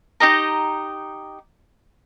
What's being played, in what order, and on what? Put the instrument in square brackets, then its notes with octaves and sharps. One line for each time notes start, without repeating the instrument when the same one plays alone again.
[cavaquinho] D#4 G4 D#5 A#5